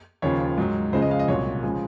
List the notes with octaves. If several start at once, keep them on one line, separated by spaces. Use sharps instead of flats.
D#2 C#3 F3 C#5
G#2 F#3
C#2 C#3 F3 G#3 C5
D#5
F5
D#5
C2 A#2 F#3 C#5
C#3 F3 G#3 G#4